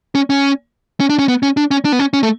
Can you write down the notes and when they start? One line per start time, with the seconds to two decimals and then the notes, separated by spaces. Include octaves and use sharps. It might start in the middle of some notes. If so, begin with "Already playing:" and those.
0.15 C#4
0.30 C#4
1.00 C#4
1.10 D4
1.19 C#4
1.28 B3
1.43 C#4
1.57 D4
1.71 C#4
1.85 D4
1.92 B3
1.99 C#4
2.13 C#4
2.23 A3